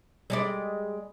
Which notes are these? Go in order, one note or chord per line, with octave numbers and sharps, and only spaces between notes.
G3 G#3 D5